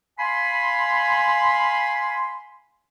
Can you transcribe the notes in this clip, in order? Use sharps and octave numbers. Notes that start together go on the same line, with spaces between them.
F5 G#5 B5 C6